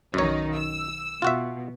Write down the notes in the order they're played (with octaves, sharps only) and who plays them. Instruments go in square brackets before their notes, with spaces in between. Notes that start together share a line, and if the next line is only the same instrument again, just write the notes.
[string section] B1 D#3 D#4 [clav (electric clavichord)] F#2 C#5
[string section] E6
[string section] B2 [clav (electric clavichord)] F4 F#4 E5